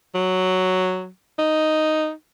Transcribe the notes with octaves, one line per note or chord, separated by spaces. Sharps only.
F#3
D#4